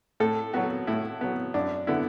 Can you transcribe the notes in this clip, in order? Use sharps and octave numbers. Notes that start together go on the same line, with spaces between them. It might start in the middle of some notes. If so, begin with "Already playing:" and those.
A2 A4
F#3 B3 F#4
A2 E4
F#3 B3
F#2 D4
D3 B3 E4